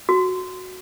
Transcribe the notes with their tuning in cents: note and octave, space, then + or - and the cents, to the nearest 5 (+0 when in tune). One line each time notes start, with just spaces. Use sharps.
F#4 -5